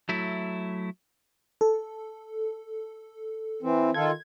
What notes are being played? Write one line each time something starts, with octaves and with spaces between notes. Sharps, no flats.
F#3 A3 E4
A4
E3 C4
D#3 F4 A4 G#6